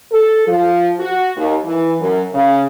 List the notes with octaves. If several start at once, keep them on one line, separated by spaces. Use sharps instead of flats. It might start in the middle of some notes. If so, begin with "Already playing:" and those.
A4
F3
F#4
D#2
E3
F#2
C#3